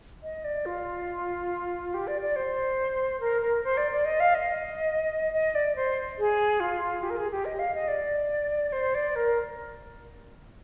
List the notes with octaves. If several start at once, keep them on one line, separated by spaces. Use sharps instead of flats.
D#5
D5
F4
G4
D5
D5
C5
A#4
A#4
C5
D5
D5
D#5
F5
D#5
D#5
D5
C5
G#4
F4
G4
A#4
G#4
G4
D#5
F5
D#5
D5
C5
D5
A#4